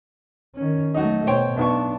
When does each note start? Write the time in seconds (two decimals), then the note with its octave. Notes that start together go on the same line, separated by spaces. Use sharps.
0.55 D#3 C#4
0.94 F#3 A3 D#4 F#4
1.27 B2 C5 C#5 G5
1.57 B1 B3 D4 C#6